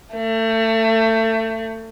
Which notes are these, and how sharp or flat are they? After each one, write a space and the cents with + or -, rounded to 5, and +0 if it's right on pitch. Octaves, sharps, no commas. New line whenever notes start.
A3 +30